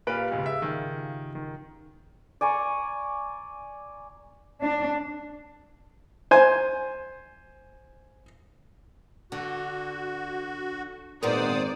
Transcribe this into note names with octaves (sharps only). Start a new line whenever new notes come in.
A#2 G4 B4 F5 A6 D7
E1 C#2 G#2 C#3
E5
D#3 F4 G#5
D#3
D5 G#5 A#5 C#6
D4
C5 G#5
D3 F#4
G#1 A#2 B3 A#4 C5 D5 D#6